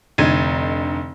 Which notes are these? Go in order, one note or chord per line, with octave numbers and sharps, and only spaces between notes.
F1 D3 D#4 G#6 D#7